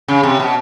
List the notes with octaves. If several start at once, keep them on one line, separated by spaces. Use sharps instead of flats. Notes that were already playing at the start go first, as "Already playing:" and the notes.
C#3
C3
B2